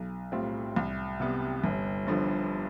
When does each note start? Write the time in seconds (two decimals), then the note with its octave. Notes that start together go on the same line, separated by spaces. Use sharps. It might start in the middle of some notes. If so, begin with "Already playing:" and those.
Already playing: B1
0.32 A2 G3 C4 F4
0.76 C2
1.20 C3 G3 B3
1.64 G1
2.07 G2 D3 F3